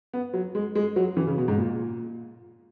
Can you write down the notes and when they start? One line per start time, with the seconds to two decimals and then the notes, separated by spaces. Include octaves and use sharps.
0.13 B3
0.33 F#3
0.55 G#3
0.75 G#3
0.96 F#3
1.17 E3
1.27 C#3
1.38 B2
1.48 G#2
1.58 A#2